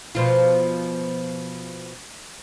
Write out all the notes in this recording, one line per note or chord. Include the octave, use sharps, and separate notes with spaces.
B2 F3 F4